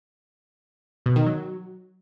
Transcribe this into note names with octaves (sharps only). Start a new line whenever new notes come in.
B2
D#3
F#3